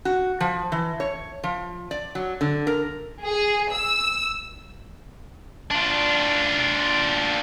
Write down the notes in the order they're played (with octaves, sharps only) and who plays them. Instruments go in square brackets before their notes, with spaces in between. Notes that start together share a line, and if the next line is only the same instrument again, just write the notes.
[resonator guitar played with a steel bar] F#4
F3
E3
C#5
F3
D5
F#3
D3
A#4
[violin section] G#4
E6
[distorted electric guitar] D4 F4